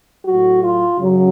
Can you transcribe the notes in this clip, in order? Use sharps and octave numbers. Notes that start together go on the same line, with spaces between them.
A2 F#3 F#4
F4
F#2 C#3 F#3